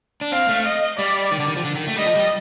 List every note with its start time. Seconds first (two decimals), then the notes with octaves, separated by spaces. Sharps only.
0.21 D4
0.32 C4 F5
0.49 A3
0.66 D#5
0.98 G3 D5
1.31 D#3
1.40 D3
1.48 D#3
1.57 F3
1.65 D3
1.75 D#3
1.87 A3
1.96 G3 D#5
2.06 F3
2.16 G3